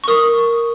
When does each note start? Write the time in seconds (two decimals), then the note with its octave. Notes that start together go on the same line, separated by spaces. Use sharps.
0.04 C#6
0.08 A#4 D#6